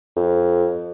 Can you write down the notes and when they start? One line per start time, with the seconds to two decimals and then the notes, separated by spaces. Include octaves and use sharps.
0.17 F2